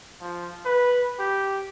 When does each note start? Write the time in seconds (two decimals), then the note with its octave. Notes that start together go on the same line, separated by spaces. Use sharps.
0.21 F3
0.65 B4
1.19 G4